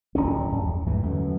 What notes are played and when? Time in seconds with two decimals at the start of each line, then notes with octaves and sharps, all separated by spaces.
0.15 D1 G#1 F#2 C#4
0.52 F#2
0.65 E2
0.86 E2 G#2 E3 A3
1.03 F#2 D3 E3